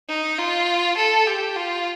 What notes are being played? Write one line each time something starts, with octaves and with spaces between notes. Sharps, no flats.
D#4
F4
A4
G4
F4